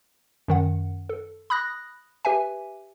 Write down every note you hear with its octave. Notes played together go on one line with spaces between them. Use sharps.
F#2 D#3 F#5
A4
B5 D#6 F#6 A#6
G4 B4 E5 G#5